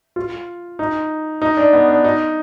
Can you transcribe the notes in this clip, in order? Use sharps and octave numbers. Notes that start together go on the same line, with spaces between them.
F4
D#4
D#4
D4
B3
D4
D#4